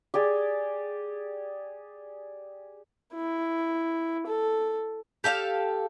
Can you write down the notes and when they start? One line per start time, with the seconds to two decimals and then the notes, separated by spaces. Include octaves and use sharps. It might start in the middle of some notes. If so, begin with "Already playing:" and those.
0.14 G4 G#4 D5
3.14 E4
4.26 A4
5.24 G4 A4 E5 F5